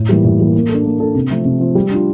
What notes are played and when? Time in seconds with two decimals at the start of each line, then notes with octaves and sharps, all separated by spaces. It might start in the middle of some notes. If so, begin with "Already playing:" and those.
Already playing: A2
0.09 E3 G3 A#3
0.24 A2
0.39 E3 G3 A#3
0.55 A#3
0.69 D4 A4
0.85 A#3
1.00 D4 A4
1.15 C3
1.30 F3 A3 C4
1.45 C3
1.60 F3 A3 C4
1.75 G3
1.91 D4 F4